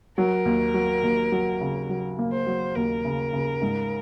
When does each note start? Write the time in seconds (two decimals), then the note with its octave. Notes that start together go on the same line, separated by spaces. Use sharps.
0.17 F#3 A#4
0.45 D#2
0.74 F#3
1.03 D#2
1.32 F#3
1.61 C#3
1.89 F#3
2.19 A#3
2.32 C5
2.47 F#3
2.75 D#2 A#4
3.05 C#3
3.33 C#3
3.62 G#2